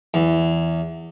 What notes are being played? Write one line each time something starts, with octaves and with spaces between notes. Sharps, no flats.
E2